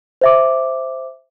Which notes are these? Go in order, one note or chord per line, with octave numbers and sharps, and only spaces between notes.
C5 E5 D6